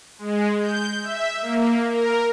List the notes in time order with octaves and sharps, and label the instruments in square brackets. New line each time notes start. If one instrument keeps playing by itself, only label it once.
[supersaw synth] G#3
G6
E5
A#3
A#4